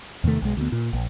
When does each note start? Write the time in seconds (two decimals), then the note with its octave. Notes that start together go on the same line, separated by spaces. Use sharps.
0.24 E2 C3 D#3 A3
0.42 B1 G#3
0.57 D2 B3
0.72 A#2
0.93 A#1